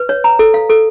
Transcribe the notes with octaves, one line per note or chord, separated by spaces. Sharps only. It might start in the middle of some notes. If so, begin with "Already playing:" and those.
Already playing: B4
C#5
A#5
A4
F5
A4